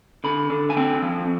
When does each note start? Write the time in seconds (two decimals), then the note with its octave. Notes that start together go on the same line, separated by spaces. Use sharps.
0.24 D3 B5
0.50 D3
0.70 G#5
0.77 C4 G5
1.02 F3